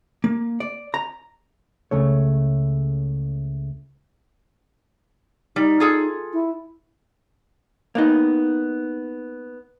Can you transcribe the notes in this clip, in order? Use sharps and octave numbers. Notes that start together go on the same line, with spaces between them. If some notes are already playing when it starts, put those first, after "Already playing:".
A#3
D5
A#5
C#2 C#3 A3 C#5
G3 D#4
F4 G#4 A4
E4
A#3 B3 D#4